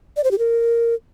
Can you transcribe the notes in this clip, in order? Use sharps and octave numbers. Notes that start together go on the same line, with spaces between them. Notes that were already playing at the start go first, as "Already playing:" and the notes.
D5
C5
G4
A#4